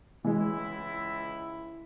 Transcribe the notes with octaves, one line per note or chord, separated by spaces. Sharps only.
C#2 E3 G#3 E4